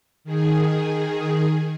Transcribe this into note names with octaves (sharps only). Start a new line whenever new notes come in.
D#3 G#4